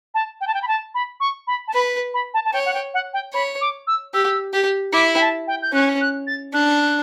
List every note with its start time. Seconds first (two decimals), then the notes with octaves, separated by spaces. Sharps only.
0.14 A5
0.41 G5
0.47 A5
0.54 G5
0.62 B5
0.68 A5
0.94 B5
1.20 C#6
1.47 B5
1.68 A5
1.74 B4 B5
2.14 B5
2.34 A5
2.45 A5
2.53 C#5 G5
2.66 F#5
2.74 G5
2.94 F#5
3.13 G5
3.33 C#5 B5
3.61 D6
3.87 E6
4.14 G4 E6
4.53 G4
4.93 E4 D6
5.16 G5
5.21 A5
5.47 G5
5.62 G6
5.73 C#4 F#6
6.01 F#6
6.27 A6
6.53 D4 F#6